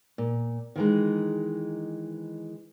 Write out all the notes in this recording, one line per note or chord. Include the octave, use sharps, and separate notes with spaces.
A#2
D#3 E3 G#3